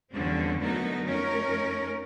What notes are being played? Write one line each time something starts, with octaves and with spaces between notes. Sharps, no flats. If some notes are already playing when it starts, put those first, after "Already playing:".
E2 G2 D3 F3 C4 C#4
D3 F#3 A3 B3 D#4 A#4
F2 A3 C#4 D#4 A#4